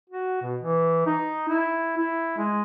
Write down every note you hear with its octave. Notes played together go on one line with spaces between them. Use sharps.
F#4
B2
E3
D#4
E4
E4
G#3